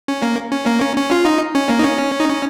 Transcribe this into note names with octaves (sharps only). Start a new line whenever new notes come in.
C#4
A#3
C#4
A#3
C#4
C#4
F4
D#4
C#4
A#3
D#4
C#4
D#4
C#4